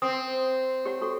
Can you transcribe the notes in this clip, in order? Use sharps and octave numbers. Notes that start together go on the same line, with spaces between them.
C4 D#6
G4 C#5 F#5
F#4 A4 C#6